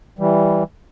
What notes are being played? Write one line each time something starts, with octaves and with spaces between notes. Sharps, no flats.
E3 G3